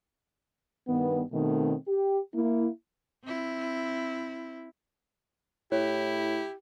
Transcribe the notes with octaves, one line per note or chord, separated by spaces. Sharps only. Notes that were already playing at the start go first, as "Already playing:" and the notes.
G2 D#3 B3
B2 D#3 A3 C4
G4
A#3 E4
C4 E4
A2 E4 G4 C#5